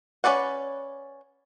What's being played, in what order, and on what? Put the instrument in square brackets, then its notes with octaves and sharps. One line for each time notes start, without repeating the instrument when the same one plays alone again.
[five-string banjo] C#4 G#4 B4 D5 F#5